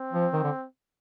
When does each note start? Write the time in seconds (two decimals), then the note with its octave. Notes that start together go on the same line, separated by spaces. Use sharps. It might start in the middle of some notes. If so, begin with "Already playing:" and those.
Already playing: C4
0.13 F3
0.33 D#3
0.43 D3